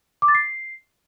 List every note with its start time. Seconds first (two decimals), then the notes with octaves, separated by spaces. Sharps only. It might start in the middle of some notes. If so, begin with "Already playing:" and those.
0.22 D6
0.28 A6
0.35 C7